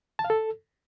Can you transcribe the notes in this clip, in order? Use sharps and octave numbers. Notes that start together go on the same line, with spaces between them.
A5
F5
A4